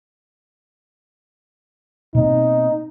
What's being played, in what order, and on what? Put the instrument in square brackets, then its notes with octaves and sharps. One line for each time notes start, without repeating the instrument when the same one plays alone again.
[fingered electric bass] B2 A#3 C4 [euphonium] D#4